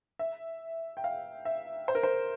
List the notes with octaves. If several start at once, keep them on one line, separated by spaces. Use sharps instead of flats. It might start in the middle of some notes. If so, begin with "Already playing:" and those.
E5
G5
F5
E5
C5
A#4
C5